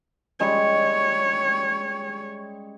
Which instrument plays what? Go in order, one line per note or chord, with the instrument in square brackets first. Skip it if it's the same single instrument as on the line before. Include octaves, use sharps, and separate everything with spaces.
[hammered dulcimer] G3 G#3 C#4 [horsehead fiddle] C#5